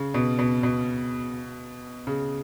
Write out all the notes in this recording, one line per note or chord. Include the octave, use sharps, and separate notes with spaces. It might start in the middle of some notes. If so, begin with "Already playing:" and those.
Already playing: C#3
B2
B2
B2
C#3